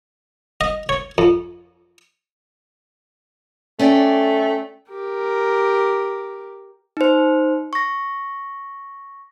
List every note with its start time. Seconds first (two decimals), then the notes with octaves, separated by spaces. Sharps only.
0.61 D#5
0.89 C#5
1.18 F2
3.79 A3 C#4 D5 G5
4.89 G4 A#4
6.97 D#4 C5
7.73 C#6 A#6